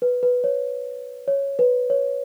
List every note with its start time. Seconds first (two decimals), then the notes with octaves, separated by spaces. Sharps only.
0.02 B4
0.23 B4
0.44 C#5
1.28 C#5
1.59 B4
1.90 C#5